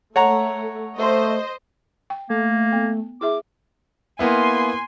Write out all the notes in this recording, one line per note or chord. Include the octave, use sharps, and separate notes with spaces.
A3 C#5 F#5 A#5
A3 C5 D#5
G5
A3 A#3
B3
E4 G#4 E5 D6
A#3 B3 E4 G#5 C6